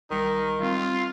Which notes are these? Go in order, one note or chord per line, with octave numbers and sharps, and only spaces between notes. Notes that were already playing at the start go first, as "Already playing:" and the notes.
B1 D#3 G3 D#4
G3 C4 F4